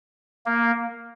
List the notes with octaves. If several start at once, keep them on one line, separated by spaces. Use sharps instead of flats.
A#3